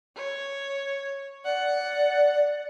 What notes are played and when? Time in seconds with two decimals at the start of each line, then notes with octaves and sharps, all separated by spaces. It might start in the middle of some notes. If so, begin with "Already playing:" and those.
0.16 C#5
1.45 D5 F#5